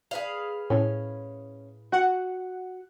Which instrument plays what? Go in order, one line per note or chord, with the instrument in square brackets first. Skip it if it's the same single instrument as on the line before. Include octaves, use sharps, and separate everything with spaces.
[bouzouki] G#4 B4 F5
[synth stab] A2 [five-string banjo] C#4
[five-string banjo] F#4 [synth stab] F#5